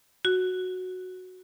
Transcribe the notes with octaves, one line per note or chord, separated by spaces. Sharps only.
F#4